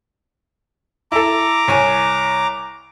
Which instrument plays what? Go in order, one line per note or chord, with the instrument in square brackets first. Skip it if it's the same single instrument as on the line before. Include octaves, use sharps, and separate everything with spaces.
[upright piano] E4 A4 [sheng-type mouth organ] A#5 D6
[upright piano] C2 C#5 G#5